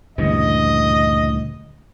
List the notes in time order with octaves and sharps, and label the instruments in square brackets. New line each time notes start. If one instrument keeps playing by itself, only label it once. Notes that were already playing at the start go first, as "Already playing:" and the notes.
[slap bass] D2 A#2 C#3 [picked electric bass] G2 E3 [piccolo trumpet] D#5